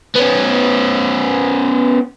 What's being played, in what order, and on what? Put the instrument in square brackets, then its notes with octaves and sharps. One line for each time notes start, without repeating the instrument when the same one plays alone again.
[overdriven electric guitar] B3 C#4